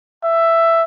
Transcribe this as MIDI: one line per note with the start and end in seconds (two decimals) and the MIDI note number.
0.24 0.84 76